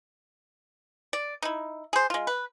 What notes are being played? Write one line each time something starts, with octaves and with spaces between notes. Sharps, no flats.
D5
D#4 E4
G#4 C5
G#3 F4
B4